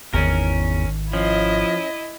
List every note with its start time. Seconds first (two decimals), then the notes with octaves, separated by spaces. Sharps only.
0.14 G#1 E2 D#3 C#4 A#4
1.13 F3 C#4 E4 D#5